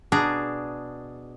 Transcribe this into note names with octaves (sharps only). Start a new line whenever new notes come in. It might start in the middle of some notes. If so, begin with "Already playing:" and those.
B2 D4 G#4 A#5